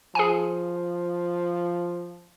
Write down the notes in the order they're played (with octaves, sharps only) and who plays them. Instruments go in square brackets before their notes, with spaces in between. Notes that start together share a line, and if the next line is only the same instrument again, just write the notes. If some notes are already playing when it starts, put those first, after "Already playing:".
[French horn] F3 [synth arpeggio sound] G#4 G#5